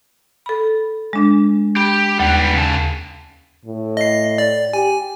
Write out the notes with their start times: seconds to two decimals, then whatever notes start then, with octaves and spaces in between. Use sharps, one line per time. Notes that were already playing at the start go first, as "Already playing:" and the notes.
0.46 A4 B5
1.13 G#3 D4
1.76 G4 B5
2.20 D#2 G3 B3
2.55 C#3 A5
3.65 A2
3.97 D#5 C7
4.38 D5
4.73 G4 G#5